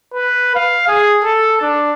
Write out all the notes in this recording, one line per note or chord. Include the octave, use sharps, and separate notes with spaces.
B4
F5
G#4
A4
D4